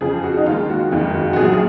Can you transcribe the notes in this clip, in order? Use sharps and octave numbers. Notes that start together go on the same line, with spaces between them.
F2 C#3 F3 G#4
F#4
D#4
D#2 D#3 G#3 F4
F#4
F#1 F2 D#3 G#3 F4
F#4
F#4
A#1 A#2 F#3 G#4
G#4